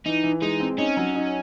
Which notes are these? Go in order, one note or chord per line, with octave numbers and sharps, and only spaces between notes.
E3 D#4
E3
G#3 D#4
C4
C#4 D#4
F#3
D#4